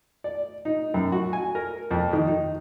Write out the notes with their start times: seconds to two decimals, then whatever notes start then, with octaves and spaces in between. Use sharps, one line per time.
0.24 D5
0.65 D#4
0.94 F#2
1.12 F#4
1.33 G#5
1.55 A#4
1.91 F2
2.13 D#3
2.28 D#4